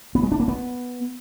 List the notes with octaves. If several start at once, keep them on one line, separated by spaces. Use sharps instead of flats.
B3
G#3
D4
A#3
B3